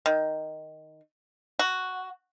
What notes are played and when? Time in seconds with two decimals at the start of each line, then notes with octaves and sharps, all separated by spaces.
0.06 D#3
1.59 F#4